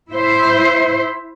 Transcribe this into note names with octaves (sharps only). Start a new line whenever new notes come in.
E4 C5 E5